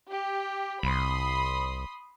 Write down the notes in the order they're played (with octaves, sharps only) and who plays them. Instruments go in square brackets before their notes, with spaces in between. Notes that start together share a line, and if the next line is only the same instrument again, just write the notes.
[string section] G4
[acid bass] C2 [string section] B5 C6 D#6